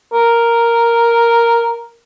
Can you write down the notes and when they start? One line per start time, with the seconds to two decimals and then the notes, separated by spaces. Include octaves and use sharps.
0.13 A#4